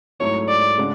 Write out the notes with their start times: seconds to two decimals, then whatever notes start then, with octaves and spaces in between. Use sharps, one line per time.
0.20 G#2 F#3 A3 E4 C#5
0.49 D5
0.78 C#3 G#3 D4 F#4